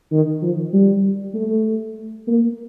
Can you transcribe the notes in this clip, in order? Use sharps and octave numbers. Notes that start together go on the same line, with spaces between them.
D#3
F3
G3
A3
A#3